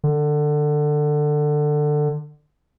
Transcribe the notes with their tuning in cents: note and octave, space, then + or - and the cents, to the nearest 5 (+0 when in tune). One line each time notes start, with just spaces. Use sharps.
D3 +20